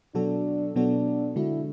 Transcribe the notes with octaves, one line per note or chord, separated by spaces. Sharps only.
B2 F#3 B3 D4 F#4 A4
B2 F#3 B3 D4 F#4 A4
D3 G#3 D4 E4 F#4 A4